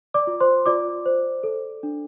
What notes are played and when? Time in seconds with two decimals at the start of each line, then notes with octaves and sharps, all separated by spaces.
0.14 D5 D6
0.27 F4
0.40 C5 C6
0.66 F4 D5 D6
1.06 C5
1.43 A4
1.83 D4